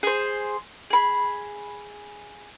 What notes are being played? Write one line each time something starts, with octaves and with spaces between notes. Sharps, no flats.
G#4 C5
G#4 B5